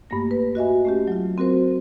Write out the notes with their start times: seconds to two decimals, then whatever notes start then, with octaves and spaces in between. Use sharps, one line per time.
0.10 G2 A3 A#3 A#6
0.31 B4
0.55 F#4 D#5 E5 G#5
0.85 A3 C#4 G4
1.08 F#3 F4
1.38 C4 F#4 A#4 C5